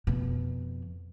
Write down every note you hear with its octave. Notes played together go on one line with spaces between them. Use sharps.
F2 B2